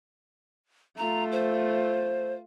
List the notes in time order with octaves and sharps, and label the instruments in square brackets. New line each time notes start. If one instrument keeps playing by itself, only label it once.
[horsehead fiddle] A3 F4 [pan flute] A#5
[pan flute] C5